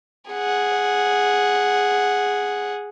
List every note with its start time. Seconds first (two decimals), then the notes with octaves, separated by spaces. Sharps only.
0.31 G#4 F#5